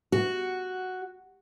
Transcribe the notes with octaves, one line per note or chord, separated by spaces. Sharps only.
F#4